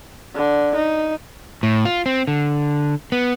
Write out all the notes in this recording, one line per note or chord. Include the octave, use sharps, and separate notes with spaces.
D3
D#4
A2
F4
C4
D3
B3